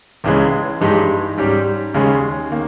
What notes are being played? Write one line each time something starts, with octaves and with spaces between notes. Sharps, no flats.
C#2 C#3 E3 G#3 C#4
G2 E3 G#3 D#4 G4
G#2 G3 C#4 G4
D#2 C#3 G#3 C#4 G#4
D#3 A#3